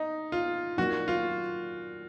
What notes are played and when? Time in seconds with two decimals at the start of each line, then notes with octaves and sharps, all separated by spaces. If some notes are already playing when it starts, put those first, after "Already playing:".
Already playing: D#4
0.32 F4
0.77 A#2 F#3 A#3 D#4 F#4
1.08 F4